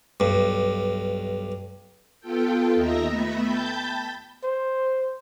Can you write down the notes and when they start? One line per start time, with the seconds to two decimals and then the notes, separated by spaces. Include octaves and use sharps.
0.20 B1 G2
2.20 B3 F4 A4 G5
2.75 D#2 D#5 E5 A#5 A#6
3.09 A3 B3 E5 B5
3.44 G5 A5 B5 G6 A6
4.44 C5